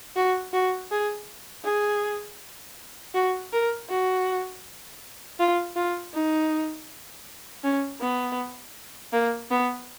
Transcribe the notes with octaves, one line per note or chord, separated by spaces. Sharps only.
F#4
F#4
G#4
G#4
F#4
A#4
F#4
F4
F4
D#4
C#4
B3
A#3
B3